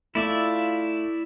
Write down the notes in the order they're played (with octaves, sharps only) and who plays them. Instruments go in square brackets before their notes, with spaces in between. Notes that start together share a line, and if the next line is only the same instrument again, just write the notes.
[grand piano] A3 [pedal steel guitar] E4 D5 E5 [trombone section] F4